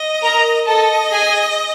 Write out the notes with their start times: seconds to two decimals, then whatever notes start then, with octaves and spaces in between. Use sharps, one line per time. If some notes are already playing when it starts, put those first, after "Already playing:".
Already playing: D#5
0.23 A#4 A#5
0.67 A4 D#5 A5
1.12 G#4 G#5